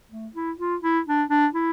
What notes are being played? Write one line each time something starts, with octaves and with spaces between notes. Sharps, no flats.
A3
E4
F4
E4
D4
D4
E4